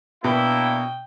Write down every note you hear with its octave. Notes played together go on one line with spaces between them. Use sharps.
B2 A#3 D4 E4 G5